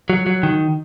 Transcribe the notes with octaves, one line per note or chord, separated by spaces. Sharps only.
F#3
F#3
D#3